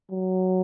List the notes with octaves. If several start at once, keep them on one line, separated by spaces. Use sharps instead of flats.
F#3